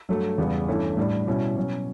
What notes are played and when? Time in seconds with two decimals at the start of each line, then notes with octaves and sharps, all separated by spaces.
0.09 G2 F#3 A3
0.38 E2 C#3 G3 B3
0.68 G2 E3 A3 C#4 E4
0.97 A2 G3 D4
1.27 B2 G3 C#4 E4
1.56 B2 F#3 C#4